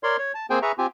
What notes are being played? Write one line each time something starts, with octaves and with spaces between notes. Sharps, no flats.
A#4 C#5 D5 C6
C#5
A5
A#3 C4 G#4 C5 G5 G#5
G#4 B4 E5 A#5 C#6
C4 F4 G4 G#5